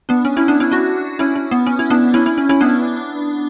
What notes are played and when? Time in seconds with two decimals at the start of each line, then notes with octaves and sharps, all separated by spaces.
0.09 B3 D4
0.25 C#4
0.37 C#4 E4
0.48 B3 D4
0.60 C#4 E4
0.72 D4 F#4
1.19 C#4 E4
1.36 C#4
1.51 B3
1.66 C#4
1.79 E4
1.90 B3 D4
2.14 C#4 E4
2.26 C#4 E4
2.38 C#4
2.49 C#4 E4
2.61 B3 D4